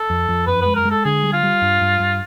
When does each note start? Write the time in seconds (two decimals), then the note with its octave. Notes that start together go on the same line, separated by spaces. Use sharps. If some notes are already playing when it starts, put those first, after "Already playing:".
Already playing: A4
0.10 F2
0.29 F2
0.47 F#2 B4
0.62 G#3 B4
0.76 A#4
0.85 G#3
0.91 A4
1.05 D3 G#4
1.24 G3
1.33 F4
1.43 G3
1.62 G2
1.81 G2
2.00 G2